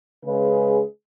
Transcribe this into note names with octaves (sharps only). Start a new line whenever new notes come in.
C#3 G#3 C#4 G#4 B4